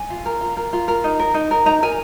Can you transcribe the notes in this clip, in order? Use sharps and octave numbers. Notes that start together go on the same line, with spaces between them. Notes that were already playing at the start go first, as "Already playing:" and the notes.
Already playing: G#5
F4
A#4
F4
A#4
F4
A#4
D#4
A#4
D#4
A#4
D#4 A#5
A#4 G#5